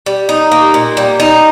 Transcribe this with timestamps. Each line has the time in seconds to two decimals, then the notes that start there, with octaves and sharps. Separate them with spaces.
0.06 G3
0.29 D#4
0.52 A#3
0.74 A#2
0.97 G3
1.20 D#4